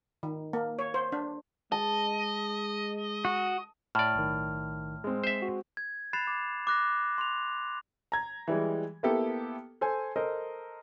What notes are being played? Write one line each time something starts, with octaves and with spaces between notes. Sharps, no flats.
D#3
A#3
C#5
C5
D4
G#3 D#5 A5
F#4
A2 D5 F6
B1 D#3
G#3 C4
C5 E5
F#4
G#6
B5 F#6 A6 C7 E7 F7
D6
D6 F#6 A#6
C6 F7
A#5 G#6
E3 G3 G#3
A#3 B3 E4 G4 A4
A4 C5 G#5
A4 A#4 C5 D#5